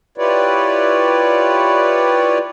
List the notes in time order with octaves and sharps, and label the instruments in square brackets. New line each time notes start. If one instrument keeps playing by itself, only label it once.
[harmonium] E4 F4 G4 B4 C#5 D5